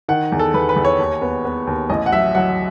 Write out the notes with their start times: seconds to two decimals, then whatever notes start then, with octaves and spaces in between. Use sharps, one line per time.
0.09 D#3 F#5
0.32 E2
0.39 A4
0.54 E2 B4
0.69 B4
0.76 E2
0.85 C#5
0.99 D#2
1.21 B3
1.45 B3
1.67 D#2
1.90 A1 D#5
2.06 F#5
2.12 F#3 E5
2.35 F#3 F#5